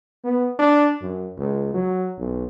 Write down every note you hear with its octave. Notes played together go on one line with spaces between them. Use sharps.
B3
D4
F#2
C#2
F#3
B1